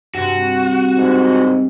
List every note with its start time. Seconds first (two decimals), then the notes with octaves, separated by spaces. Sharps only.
0.15 G2 C3 F#4
0.96 G#2